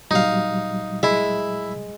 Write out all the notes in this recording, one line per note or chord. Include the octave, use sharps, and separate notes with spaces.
A#2 F#3 G3 D#4 F5
G#3 E4 E5